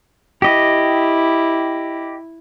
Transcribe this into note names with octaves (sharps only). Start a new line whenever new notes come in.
E4 G4 D#5